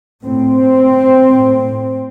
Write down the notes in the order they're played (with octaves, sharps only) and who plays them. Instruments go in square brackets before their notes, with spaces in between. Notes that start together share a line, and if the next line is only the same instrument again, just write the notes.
[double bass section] A2 C4
A2